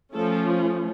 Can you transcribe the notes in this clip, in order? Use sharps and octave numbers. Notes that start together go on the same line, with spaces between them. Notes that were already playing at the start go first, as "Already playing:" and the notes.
F3 A3 C#4 A4